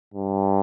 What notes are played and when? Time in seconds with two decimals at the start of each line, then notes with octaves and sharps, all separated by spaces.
0.14 G2